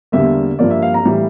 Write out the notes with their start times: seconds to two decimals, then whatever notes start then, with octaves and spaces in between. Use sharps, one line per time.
0.12 E2 D3 G3 A#3 E5
0.59 G2 F3 A#3 D5
0.70 E5
0.82 F5
0.94 A#5
1.05 A2 E3 G3